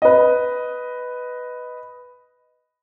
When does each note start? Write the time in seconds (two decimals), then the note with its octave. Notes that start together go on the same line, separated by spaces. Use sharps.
0.02 B4 D#5